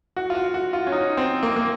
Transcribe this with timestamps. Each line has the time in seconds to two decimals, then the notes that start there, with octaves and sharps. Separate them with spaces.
0.16 F#4
0.30 F4
0.35 F#4
0.54 F#4
0.73 F4
0.87 C#4
0.92 D#4
1.17 C4
1.43 A#3
1.56 A#3